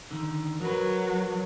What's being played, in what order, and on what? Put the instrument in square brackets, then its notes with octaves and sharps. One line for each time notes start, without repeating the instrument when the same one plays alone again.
[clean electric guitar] D3 D#3
[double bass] F#3 [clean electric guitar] A#4 B4